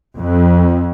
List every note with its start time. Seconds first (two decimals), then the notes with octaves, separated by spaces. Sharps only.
0.16 F2